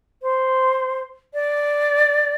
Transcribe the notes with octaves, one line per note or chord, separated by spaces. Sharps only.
C5
D5